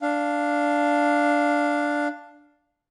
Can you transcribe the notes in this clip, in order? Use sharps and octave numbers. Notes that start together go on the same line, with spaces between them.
D4 F5